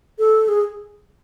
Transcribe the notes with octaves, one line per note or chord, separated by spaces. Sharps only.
A4
G#4